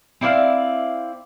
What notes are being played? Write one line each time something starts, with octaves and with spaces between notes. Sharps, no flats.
C4 E4 D5 F5